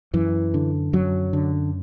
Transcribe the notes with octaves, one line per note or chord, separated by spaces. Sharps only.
F#2 E3
D3
F#2 F#3
D3